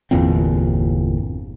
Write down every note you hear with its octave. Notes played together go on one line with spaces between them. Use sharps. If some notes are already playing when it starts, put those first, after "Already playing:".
G1 E2 A#2 C4